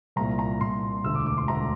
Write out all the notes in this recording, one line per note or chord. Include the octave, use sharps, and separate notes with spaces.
C2 A#2 A#5
A#5
C2 A#2 C6
E1 D2 D3 E6
D6
D6
C6
E1 D2 D3 A#5